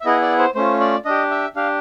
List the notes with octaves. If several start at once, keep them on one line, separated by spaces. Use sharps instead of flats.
E5
B3 E4 G#4 D#5
D5
C5
A3 C#4 F4 C5
D5
D4 G4 D#5
E5
D4 G4 F5